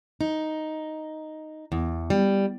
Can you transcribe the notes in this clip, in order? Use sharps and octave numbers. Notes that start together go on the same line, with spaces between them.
D#4
E2
G3